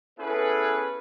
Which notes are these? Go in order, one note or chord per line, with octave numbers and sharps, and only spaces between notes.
B3 C#4 E4 G#4 A4 B4